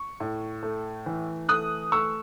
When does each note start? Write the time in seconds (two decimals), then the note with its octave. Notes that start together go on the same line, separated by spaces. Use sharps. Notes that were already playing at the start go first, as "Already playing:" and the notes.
Already playing: C#6
0.20 A2
0.63 A3
1.06 E3
1.49 A3 D#6 F#6
1.92 A3 C#6 E6